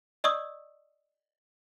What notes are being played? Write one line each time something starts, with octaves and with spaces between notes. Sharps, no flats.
D5 D#5 C#6 D#6 E6